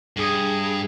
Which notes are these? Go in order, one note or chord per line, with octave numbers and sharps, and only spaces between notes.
G2 G#4